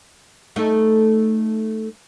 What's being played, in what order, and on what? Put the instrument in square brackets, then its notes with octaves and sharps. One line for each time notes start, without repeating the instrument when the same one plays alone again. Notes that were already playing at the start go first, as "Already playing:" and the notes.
[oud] A3 D#4 A4